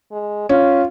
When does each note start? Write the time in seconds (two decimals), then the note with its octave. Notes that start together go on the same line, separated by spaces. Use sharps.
0.12 G#3
0.49 C#4 F4